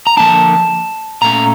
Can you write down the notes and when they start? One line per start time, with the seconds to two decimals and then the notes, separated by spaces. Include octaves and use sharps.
0.07 A#5
0.17 D3 F3 A#3 D4 A5
1.22 A#2 A3 C#4 A#5